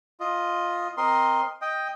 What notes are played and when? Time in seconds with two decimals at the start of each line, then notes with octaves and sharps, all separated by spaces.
0.20 F4 D#5
0.97 C4 A#4 D#5 C6
1.62 D#5 G5